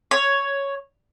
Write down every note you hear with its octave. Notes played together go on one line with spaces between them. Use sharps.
C#5